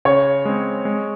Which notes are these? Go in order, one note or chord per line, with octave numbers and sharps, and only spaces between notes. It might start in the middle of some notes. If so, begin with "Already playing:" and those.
C#3 C#5
G#3 C4
G#3